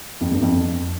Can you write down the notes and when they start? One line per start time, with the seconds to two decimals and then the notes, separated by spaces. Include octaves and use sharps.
0.21 F2
0.31 G2
0.42 F2